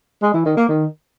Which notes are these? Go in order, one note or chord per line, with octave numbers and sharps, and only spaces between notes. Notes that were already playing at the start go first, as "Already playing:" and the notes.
G#3
E3
D#3
A#3
D#3